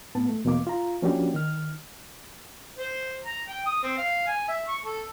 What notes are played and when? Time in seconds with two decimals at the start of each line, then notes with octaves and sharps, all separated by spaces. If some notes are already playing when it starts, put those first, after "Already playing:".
0.15 A2 B3 A5
0.29 A3
0.45 E2 B2 E3 A#3 D6
0.67 F4 A#5
1.02 F3 A#3 C#4 D4 F#4 G4
1.34 D#3 F6
2.78 C5
3.24 A#5
3.48 G5
3.65 D#6
3.83 C4
3.98 F5
4.27 G#5
4.48 E5
4.68 C#6
4.85 A4